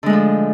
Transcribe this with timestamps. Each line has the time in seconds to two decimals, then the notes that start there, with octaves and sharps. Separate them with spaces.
0.03 D3
0.06 G#3
0.10 A3
0.13 F3